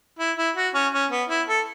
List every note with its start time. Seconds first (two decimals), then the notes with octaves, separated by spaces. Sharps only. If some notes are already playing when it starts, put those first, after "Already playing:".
0.19 E4
0.37 E4
0.56 F#4
0.74 C#4
0.93 C#4
1.11 B3
1.30 E4
1.48 A4